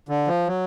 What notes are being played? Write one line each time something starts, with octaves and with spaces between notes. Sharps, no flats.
D3
F3
F#3